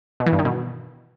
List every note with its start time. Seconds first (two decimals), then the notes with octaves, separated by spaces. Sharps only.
0.20 B2
0.26 E3
0.33 G2
0.39 D#3
0.45 B2